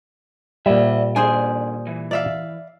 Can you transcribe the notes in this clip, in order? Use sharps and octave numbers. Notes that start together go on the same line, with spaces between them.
A#2 G3 D5 E5
D#3 D4 G#4 C5 G#5
E3
D5 E5 F5